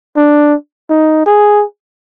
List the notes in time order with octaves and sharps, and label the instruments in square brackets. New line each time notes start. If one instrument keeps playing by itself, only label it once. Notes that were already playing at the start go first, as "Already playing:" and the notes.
[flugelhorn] D4
D#4
G#4